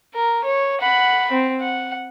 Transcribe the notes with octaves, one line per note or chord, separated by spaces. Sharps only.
A#4
C#5
F#5 B5
C4
F#5